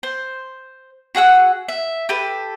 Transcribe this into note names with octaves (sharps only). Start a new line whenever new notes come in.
C5
F#4 G#4 F#5 E6
E5
G4 A4 B4